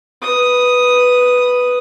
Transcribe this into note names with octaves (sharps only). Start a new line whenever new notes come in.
B4 D#6